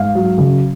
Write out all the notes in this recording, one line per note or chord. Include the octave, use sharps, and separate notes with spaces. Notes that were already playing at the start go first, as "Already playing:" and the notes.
Already playing: G#2 F5
F#3
C#3